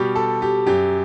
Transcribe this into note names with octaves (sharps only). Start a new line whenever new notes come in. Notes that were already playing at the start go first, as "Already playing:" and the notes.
Already playing: B2 G3 G4
A4
G4
F#2 F#3 G4